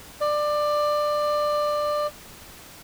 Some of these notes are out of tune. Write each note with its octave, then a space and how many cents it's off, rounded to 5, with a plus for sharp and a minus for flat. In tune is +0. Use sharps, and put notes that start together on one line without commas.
D5 +15